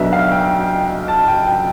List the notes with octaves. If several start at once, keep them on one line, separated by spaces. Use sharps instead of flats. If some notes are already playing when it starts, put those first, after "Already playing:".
Already playing: B1 B2 B3 D4 E5
F5
G5
G5
A5
G5
G5